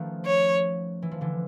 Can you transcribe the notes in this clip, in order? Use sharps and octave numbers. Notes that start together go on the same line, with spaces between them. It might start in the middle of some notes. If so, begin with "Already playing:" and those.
Already playing: D#3 F3 A3 B3 C#4
C#5
E3
F3
D3 E3